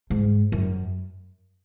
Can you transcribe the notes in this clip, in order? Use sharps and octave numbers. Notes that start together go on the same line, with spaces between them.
G#2
F#2